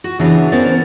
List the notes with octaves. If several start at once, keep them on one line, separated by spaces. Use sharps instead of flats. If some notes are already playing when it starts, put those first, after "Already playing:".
F#4
C#3 E3 B3 D4 A#5
D#3 B3 C#4 A#4 C5 D5